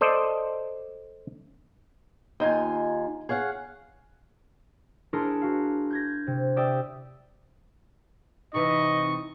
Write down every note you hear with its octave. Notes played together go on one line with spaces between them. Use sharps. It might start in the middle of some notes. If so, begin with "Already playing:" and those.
A4 C5 D5 D#5
D#2 D#4 F4 G#5
G#4 C#5 F5 F#5
D4 E4 G#4 A#4 C6 C#7
F#4 F5
G6 G#6 A#6
C3
G4 D5 E5 G5 D#6 E6
C3 E3 D#4 D#5 C#6